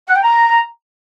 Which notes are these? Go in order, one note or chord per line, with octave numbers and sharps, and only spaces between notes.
F#5
G5
A#5